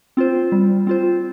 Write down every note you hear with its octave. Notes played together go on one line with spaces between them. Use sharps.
C4 F4 C5
G3
C4 F4 C5